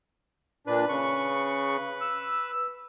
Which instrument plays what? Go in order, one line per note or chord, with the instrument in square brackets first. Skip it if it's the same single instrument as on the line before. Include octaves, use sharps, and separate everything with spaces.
[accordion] A#2 D4 [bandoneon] B4
[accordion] C#3 C#6
E6